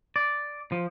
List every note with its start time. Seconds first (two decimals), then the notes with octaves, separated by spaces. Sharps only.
0.16 D5
0.72 F3